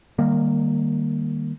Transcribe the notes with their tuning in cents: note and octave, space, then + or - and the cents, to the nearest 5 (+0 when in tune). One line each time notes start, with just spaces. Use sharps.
D#3 -25 G3 +20 A#3 +0